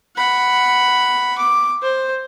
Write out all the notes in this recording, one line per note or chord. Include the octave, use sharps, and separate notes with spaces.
F#5 B5
D6
C5